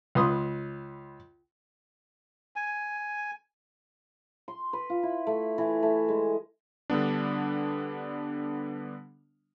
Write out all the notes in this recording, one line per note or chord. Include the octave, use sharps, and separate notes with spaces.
C#2 B4 C6 D#6
G#5
C6
B4
F4
E4
A3
E3
A3
G#3
D3 G3 B3 D4